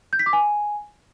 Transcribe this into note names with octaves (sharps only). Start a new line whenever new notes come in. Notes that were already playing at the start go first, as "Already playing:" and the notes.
G6
B6
D6
G#5